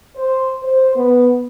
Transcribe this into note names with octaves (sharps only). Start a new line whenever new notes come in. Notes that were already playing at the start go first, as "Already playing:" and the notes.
C5
C5
B3